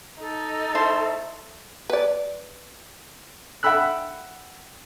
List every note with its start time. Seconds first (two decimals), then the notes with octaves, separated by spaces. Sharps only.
0.20 D#4 A4
0.75 A3 E4 C5 A5
1.90 B4 D5
3.63 E5 F#5 G5 B5 E6 F#6